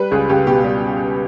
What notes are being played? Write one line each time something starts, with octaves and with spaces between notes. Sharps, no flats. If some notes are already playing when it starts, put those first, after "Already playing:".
Already playing: G3 B4
C#2 G#4
C#2 G4
B2 G4
G3